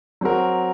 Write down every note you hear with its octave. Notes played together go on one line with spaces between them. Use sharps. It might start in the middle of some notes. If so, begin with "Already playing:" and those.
F#3 C4 F#4 A#4